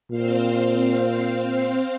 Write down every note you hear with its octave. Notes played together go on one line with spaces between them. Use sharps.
A#2 C4 C5 F5